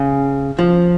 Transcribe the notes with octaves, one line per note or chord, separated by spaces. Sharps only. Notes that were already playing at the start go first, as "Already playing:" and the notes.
Already playing: C#3
F3